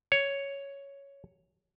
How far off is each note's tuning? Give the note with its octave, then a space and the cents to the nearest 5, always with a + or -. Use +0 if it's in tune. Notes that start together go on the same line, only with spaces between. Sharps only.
C#5 +5